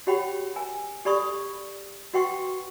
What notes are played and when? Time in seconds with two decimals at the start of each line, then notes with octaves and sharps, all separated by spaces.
0.07 F#4 G4 C#5 F#5 G5 B5
0.56 A#4 G#5
1.05 G4 A4 D5 B5 C#6 D#6
2.14 F#4 B4 F#5 G5 C6 C#6